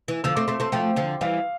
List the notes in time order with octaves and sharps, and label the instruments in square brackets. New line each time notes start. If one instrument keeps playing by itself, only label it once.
[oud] E3
[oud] D3 F3 [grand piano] E6
[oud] A3 C4 [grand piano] D6
[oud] A3 C4 [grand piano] C6
[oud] A3 C4 [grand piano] C6
[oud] F3 A3 [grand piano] G5
[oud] D3 F3
[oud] E3 G3 [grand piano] F5